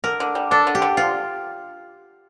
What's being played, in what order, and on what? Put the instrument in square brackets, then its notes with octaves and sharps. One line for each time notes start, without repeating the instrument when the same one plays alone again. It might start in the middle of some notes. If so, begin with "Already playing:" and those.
[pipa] D3 [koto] A#4
[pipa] D3
G3
[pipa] D4 [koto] A4
[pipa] D3
[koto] G4
[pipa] D3
[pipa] F3 [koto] F4